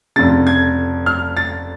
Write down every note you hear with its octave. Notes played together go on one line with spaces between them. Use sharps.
F1 F2 C#3 A6
G#6
F6
A6